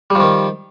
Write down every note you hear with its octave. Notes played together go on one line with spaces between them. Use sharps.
D#3 F3 G3